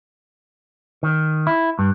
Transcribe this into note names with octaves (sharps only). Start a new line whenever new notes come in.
D#3
E4
G2